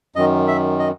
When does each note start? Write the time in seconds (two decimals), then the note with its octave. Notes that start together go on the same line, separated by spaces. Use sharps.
0.16 F#2 D#3 D#5
0.48 E5
0.79 D#5